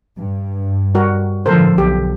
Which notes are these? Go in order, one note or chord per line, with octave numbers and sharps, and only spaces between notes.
G2
G3 F#4 A#4
A2 D3 F3 A4 A#4 C5
B1 G4